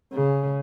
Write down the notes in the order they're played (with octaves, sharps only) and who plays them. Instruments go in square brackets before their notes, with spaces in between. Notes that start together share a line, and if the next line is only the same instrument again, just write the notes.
[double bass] C#3